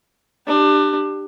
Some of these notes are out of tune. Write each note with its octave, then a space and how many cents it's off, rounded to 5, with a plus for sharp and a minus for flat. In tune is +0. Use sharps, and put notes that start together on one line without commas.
D4 +25 G4 +0